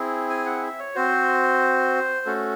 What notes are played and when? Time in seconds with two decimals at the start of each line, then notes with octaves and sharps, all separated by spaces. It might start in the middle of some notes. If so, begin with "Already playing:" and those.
Already playing: C4 E4 G#4
0.30 G#5
0.46 F#5
0.63 E5
0.79 C#5
0.95 C4 F#4 C5
2.26 A3 C#4 F#4 A4